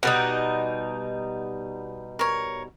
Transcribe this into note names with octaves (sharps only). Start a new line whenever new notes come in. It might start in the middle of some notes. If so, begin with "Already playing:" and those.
B2 G3 D#4 F#5
A#4 C#5